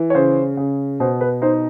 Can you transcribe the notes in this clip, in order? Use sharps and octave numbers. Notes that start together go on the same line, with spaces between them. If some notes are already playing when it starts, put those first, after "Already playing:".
Already playing: E3
C#5
C#3 C5
C#3
B2 C5
B4
D#4 C5